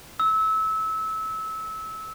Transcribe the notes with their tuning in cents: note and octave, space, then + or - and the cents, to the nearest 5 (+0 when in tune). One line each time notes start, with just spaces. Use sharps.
E6 -25